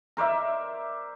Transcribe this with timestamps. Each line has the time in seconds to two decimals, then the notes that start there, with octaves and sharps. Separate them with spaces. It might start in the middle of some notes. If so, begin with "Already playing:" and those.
0.17 A#4 C5 D5 E5